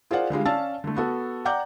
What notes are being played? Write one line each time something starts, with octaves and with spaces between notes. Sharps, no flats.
F4 G#4 A#4 C5 D5 F#5
D3 G3 G#3 F4
C#4 D5 F5 A5 E6 A6
D3 A3
B3 F#4 A4
D5 F#5 G5 A#5 D6 G6